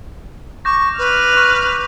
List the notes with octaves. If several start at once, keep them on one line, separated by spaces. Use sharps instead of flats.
C#6 D6 G6 A#6
B4 F6
C#6 D#7 F7